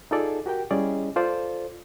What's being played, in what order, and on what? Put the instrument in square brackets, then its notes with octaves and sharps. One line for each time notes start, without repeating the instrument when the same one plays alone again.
[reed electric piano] D#4 F4 G#4 A4 D5
F#4 G4 A#4 G5
G3 C#4 E4 G#4 D5 D#5
F4 A4 C5 D5